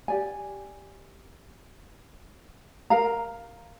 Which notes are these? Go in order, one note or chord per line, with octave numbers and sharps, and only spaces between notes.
G4 D5 G#5
A#4 F5 A#5